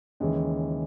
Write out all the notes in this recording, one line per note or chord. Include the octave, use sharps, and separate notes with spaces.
D#2 C#3 E3 G#3 C#4